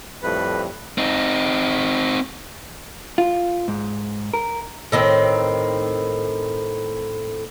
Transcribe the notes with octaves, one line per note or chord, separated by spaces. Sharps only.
F2 A2 G3 B4
C4 D#4
F4
G#2
A#4
A2 D#3 C4